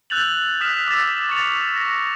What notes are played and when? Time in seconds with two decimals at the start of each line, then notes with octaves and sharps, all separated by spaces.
0.10 E6 F#6 G6 A6 F7 F#7
0.61 D#6 F6 F#6 B6 E7
0.88 D6 E6 A6 B6
1.29 C#6 A6 C#7 F7
1.76 A#6